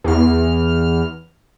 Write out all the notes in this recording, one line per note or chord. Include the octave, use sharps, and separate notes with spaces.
E2 F6